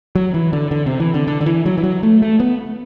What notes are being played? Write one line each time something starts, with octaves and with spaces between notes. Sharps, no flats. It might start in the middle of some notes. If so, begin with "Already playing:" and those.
F#3
E3
D3
D3
C3
E3
D3
D3
D3
E3
F#3
E3
F#3
A3
A3
B3